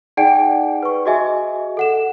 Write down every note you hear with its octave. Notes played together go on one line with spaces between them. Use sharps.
D#4 G#4 D5 F#5 G5 D7
B4 C#6
F#4 G#4 D#5 E5 G#5
A4 F#5 E7